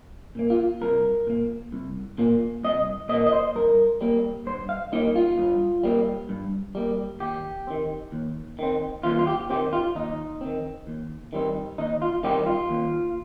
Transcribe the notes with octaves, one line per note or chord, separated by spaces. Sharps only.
A#2 A#3
F4
C2 A#4
A#2 A#3
C2
A#2 A#3
C2 D#5
A#2 A#3 D#5
D#5
C5
G2 A#4
G3 A#3
G2 C5
F5
G3 A#3 D#4
F4
G2
G3 A#3
G2
G3 A#3
D#2 G4
D#3 C4
D#2
D#3 C4
D#2 F4
F4
G4
D#3 C4 G4
F4
D#2 D#4
D#3 C4
D#2
D#3 G3 C4
D#2 D#4
F4
D#3 G3 C4 G4
F4
D#2